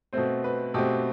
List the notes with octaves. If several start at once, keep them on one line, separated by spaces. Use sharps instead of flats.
B2 A3 C4 C5
B4
B2 A3 C4 G4